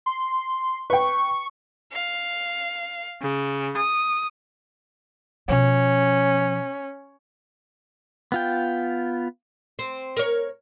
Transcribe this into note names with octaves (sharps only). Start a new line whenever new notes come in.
C6
B4 G5 C#6
F5
C#3
D#6
B2 F3 C#4
B3 F4 G5
C4
A#4 C#5